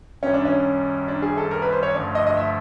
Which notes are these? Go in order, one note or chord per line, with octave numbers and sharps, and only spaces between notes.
F#2 D#3 G3 C#4
D4
C#4
D4
G#4
A4
A#4
B4
C5
C#5
G2 D3 F3 A3 D5
D#5
D#5
E5